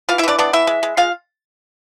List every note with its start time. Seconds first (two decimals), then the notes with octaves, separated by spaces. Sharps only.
0.09 E3 F4 F5
0.18 E4 E5
0.23 E3 D4 D5
0.38 B3 D4 D5
0.53 E3 E4 E5
0.67 G#3
0.83 G#3
0.97 G#3 F4 F5